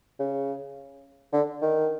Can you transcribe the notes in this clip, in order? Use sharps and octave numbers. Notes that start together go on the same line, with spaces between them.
C#3
D3
D#3